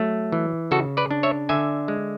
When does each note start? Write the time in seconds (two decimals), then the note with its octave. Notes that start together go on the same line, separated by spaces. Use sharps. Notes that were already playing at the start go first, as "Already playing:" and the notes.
Already playing: F#3 A3
0.32 E3
0.71 C#3 F#4 A4
0.97 B4 D5
1.11 D4
1.23 C#5 E5
1.49 D3 E5 G#5
1.88 G#3